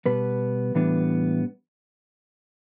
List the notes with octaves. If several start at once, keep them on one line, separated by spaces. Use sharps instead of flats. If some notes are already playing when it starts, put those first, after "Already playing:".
B2 G3 B3 B4
A2 E3 G3 B3 D4